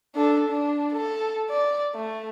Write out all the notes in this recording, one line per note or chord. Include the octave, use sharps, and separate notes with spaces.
D4 A4
D4
A4
D5
A3